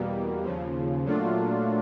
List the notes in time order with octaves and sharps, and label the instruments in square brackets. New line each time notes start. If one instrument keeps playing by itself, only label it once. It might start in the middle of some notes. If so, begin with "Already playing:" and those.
Already playing: [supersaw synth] E2 B2 G3 A#3
D#2 C#3 F3
A#2 F#3 A3 D4 F4